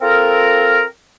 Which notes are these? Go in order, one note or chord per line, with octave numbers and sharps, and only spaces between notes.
C4 F4 A4 A#4